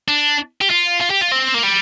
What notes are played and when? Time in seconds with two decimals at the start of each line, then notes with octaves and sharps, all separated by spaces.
0.08 D4
0.61 G4
0.70 F4
1.01 F4
1.10 G4
1.21 F4
1.31 C4
1.54 A#3
1.63 G3